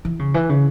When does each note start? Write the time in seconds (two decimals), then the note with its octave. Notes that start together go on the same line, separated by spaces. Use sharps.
0.05 E3
0.19 C#3
0.34 E3
0.49 C#3